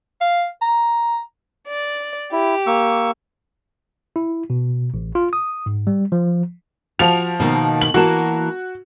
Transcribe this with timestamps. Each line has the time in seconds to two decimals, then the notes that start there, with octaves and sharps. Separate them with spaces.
0.21 F5
0.61 A#5
1.68 D5
2.32 E4 G4
2.67 A#3 C#6 E6
4.16 E4
4.50 B2
4.94 A1
5.15 F4
5.33 D#6
5.66 G#2
5.87 G3
6.12 F3
6.99 F3 F#4 F7
7.40 B2 D#3 A#3
7.81 F#7
7.94 E3 A#3 F#4 A5